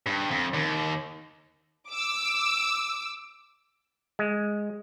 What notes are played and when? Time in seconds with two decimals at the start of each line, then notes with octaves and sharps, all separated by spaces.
0.07 G2
0.31 F2
0.54 D#2
1.90 D6 E6
4.19 G#3